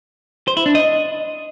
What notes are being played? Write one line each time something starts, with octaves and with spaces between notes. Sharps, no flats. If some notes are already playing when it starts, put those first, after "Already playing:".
C5
E4
D4
D#5